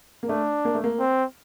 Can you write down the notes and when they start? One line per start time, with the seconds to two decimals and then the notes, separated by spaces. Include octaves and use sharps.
0.23 A#3
0.29 A3 D4
0.65 A#3
0.75 A3
0.84 A#3
0.99 C4